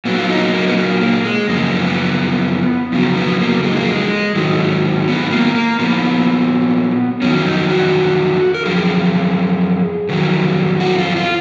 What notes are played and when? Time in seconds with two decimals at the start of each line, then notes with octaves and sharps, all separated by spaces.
0.05 A#2 F#3 B3
0.18 F4
0.29 D#4
0.54 A#3
0.68 B3
0.77 A#3
1.01 A#3
1.25 G#3
1.48 F#2 C#3 F3 A#3
1.84 B3
2.92 F2 C#3 F#3
3.16 B3
3.40 A#3
3.64 G#3
3.77 A#3
3.89 G#3
4.35 G#2 D#3 F#3
5.08 B3
5.31 A#3
5.55 A#3
5.79 A#2 F3 B3
7.22 F2 D#3 F#3 C#4
7.45 D#4
7.70 F#4
8.54 A#4
8.65 F#2 C#3 F3 G#4
10.09 F2 D#3 F#3
10.80 F#4
10.99 F4
11.16 F4